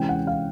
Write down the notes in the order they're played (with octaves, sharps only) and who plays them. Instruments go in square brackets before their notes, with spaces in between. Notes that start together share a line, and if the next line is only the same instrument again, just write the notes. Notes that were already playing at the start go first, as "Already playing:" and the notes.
Already playing: [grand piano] C3 E3 G#3 C#4 G5
F#5
F5